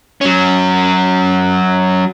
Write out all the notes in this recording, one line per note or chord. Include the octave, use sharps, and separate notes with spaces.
F#3 C#4